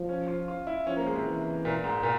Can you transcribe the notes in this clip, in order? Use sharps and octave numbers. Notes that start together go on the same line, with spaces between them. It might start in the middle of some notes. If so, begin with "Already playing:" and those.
Already playing: F3
C#4
F4
F4
E4
F3 C#4
A#3
G#3
C3
E3
A#2
G#2
A#2